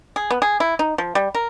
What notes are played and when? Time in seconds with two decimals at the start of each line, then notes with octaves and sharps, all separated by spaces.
0.16 G#4
0.31 B3
0.42 G#4
0.60 E4
0.79 D#4
0.98 F3
1.15 G3
1.35 A#4